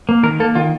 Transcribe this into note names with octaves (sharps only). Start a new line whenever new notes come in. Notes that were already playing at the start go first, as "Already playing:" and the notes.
A#3
D#3 A#4
A#3 A4
D#3 F4